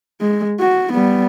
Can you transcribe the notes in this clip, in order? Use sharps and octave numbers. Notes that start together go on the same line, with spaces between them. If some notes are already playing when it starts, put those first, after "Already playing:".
G#3
F#4
G3 B3